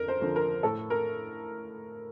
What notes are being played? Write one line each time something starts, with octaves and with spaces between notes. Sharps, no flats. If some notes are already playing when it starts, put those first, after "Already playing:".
Already playing: F2 D3 A#4
C5
D3 F3
A#4
A2 A4
A#4